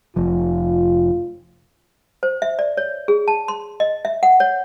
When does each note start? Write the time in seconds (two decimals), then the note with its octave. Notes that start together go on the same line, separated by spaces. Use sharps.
0.16 F1 F3 F4
2.23 C5
2.42 E5
2.59 D5
2.77 C#5
3.08 G#4
3.28 A5
3.48 C6
3.80 D#5
4.05 E5
4.23 F#5
4.40 C#5